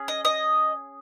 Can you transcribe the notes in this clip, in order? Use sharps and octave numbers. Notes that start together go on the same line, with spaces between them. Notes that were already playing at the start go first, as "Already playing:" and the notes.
Already playing: C#4 G#4
D#5
D#5